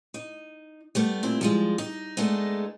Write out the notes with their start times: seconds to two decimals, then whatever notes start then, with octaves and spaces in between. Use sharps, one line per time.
0.14 D#4
0.95 G3 A3 B3
1.23 A#2 C4 E4
1.41 F3 G3 G#3
1.78 D#4
2.17 G#3 A3 B3 D4 D#4